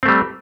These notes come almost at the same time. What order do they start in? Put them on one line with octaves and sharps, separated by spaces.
C4 A3 G3